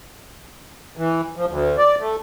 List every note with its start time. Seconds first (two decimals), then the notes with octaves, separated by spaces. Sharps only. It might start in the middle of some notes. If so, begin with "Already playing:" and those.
0.97 E3
1.37 F3
1.48 D2
1.78 D5
1.99 A3